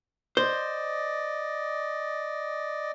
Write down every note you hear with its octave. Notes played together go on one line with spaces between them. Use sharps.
C5 D5 D#5